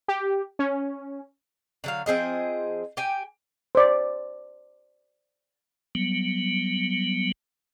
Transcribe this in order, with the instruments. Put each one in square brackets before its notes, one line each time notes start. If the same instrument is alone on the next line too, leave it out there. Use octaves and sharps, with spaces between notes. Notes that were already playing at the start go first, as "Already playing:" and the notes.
[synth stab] G4
C#4
[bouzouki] D3 F#3 F5
F3 C4 G#4 D#5
G4 G5 G#5
[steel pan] C5 D5
[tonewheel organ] F#3 G3 B3